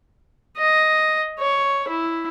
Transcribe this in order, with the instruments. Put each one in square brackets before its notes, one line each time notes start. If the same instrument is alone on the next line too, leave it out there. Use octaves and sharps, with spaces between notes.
[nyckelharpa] D#5
C#5
E4